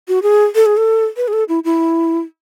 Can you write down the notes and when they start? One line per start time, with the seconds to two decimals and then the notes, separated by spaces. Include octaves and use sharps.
0.08 F#4
0.23 G#4
0.55 A4
0.66 G#4
0.77 A4
1.17 B4
1.28 G#4
1.33 A4
1.49 E4
1.64 E4